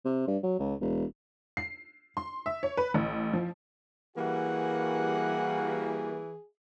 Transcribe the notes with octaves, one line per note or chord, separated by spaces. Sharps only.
C3
G2
F#3
C#2
E1
C7
C6
E5
C#5
B4
A1
F3
E3 G3 A#3 F#4 G#4 F#5